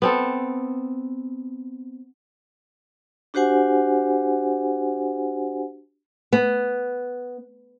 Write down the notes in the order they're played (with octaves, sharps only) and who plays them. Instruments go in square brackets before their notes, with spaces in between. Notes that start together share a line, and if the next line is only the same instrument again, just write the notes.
[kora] B3 C4 A4
[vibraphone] D4 F#4 G4 C5 F#5 G#5
[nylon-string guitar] B3